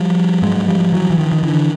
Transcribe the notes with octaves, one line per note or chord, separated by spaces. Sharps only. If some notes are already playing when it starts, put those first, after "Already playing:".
Already playing: F3 G3
G#2 F#3 G#3
F3 G3
E3 F#3
E3
D#3 F3
D#3
D3 E3